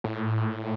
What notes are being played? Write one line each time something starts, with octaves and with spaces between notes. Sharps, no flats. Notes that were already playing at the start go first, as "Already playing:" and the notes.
A2